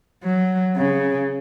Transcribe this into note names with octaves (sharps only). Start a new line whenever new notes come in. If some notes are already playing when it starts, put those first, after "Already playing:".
F#3
C#3